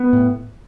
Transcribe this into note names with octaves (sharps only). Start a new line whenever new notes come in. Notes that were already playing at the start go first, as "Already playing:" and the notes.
Already playing: B3
A2